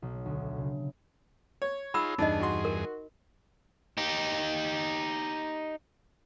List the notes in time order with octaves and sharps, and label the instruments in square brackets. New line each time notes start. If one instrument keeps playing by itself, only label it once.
[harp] B1
D2
C#3
[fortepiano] C#5
[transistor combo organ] D#4 F4 G#4 [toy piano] B5 E6
[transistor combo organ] E2 G2 G#4 [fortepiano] D4 [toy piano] D#4 D#5
[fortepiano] F#4 C6
[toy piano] A#4
[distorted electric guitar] D#4 G4